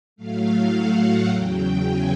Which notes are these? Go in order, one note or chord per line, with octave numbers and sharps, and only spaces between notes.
A2 F#3 A3 F5
F#5
E2 C#3 F#3 G5
G#5